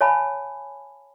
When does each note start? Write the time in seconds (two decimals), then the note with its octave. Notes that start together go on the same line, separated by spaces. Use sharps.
0.01 C#5 F5 G#5 A5 B5